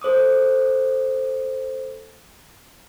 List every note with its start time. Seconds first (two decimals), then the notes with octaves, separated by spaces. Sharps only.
0.02 A4 C5 D6 D#6